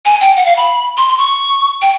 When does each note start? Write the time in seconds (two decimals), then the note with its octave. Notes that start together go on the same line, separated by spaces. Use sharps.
0.05 G#5
0.21 G5
0.37 F#5
0.46 F5
0.57 B5
0.97 C6
1.08 C6
1.18 C#6
1.82 G5